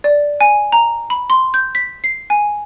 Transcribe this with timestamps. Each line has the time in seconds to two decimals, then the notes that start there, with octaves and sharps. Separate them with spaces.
0.04 D5
0.41 G#5
0.72 A#5
1.10 B5
1.30 C6
1.54 G6
1.75 B6
2.04 C7
2.30 G#5